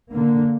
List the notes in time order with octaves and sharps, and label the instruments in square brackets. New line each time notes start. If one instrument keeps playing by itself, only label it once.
[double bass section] D3 A#3